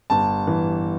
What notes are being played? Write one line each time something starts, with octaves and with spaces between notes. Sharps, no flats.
G1 A5
E3